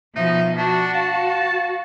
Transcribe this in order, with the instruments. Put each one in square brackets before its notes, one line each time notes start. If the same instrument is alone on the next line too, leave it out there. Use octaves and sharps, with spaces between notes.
[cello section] B2 F3 [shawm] D#4 [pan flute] E5
[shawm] D4 [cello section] F#4 [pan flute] A5
[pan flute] F5 [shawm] A5